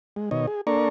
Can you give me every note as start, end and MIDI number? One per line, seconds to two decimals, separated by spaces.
0.16 0.30 56
0.31 0.46 47
0.31 0.46 51
0.31 0.46 73
0.31 0.46 75
0.47 0.61 68
0.67 0.89 58
0.67 0.89 62
0.67 0.89 69
0.67 0.89 74
0.67 0.89 82
0.67 0.89 85